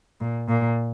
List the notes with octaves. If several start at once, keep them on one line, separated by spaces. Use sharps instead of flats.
A#2
A#2